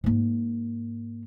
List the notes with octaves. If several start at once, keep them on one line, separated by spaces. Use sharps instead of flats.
G#2 A#3